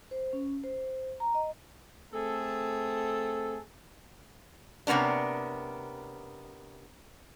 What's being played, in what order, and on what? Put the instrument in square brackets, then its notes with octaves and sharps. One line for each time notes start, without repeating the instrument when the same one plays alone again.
[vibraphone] C5
C#4
C5
A#5
D#5
[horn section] A3 C4 G#4 A4
[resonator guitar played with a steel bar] C3 A#3 B3 C#4 D4